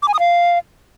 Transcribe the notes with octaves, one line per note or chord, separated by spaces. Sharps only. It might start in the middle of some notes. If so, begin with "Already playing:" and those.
D6
G#5
D#6
F5